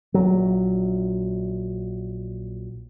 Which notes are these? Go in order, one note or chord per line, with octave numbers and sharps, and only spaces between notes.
A#1 F#3